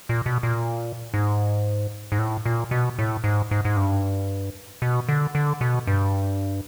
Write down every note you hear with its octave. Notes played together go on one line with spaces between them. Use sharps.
A#2
B2
A#2
G#2
G#2
A2
A#2
B2
A2
G#2
G#2
G#2
G2
B2
D3
D3
B2
G2